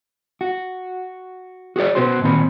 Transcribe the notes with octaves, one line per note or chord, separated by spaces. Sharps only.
F#4
F#4 G#4 A#4 D5
B2 B3 F#4 C5 C6
A#2 D#3 C4 B5